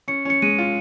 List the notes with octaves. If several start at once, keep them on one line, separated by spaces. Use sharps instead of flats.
C#4 C#7
C#4 C#7
G#3 D#7
F4